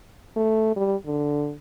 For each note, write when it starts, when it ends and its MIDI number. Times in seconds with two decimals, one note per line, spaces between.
0.36 0.76 57
0.76 0.95 55
1.06 1.54 50